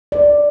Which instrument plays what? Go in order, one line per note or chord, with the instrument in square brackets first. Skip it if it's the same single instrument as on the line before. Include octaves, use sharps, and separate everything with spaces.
[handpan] D5